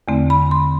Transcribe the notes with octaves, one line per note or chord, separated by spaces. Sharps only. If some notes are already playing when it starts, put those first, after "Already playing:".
E2 D3 A3 C4
B5
C6